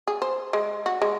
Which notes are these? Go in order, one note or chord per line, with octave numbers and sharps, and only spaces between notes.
G#4
C5
G#3
F#4
G#3